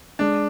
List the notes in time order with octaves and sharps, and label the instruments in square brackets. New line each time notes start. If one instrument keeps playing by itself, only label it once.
[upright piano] G#3 [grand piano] D4